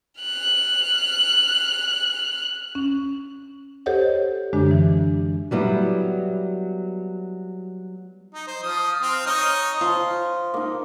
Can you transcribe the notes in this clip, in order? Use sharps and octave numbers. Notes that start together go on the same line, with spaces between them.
F6 F#6
C#4
G4 A4 C5 C#5 D#5 F#5
F#2 D3 G#3 D4 G4
E3
F#3 G3 B3 E4
D#4
C5
F3 D#6
C4 F6
D#4 C#5 D#5
F3 F4
A#3 D#4